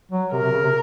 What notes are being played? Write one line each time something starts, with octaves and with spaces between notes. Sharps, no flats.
F#3
C3 A#4
C3
C#3
C3